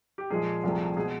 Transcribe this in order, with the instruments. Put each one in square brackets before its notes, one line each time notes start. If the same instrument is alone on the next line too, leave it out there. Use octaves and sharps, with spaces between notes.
[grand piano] G4
A#2 F3 G#3 G#4
C2 C3 F3 A3
B2 G#3 G#4